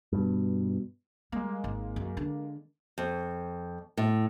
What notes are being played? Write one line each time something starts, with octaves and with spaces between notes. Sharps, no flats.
G2 B2
G3 G#3 A#3
G#1
F#2
D3
F2
A2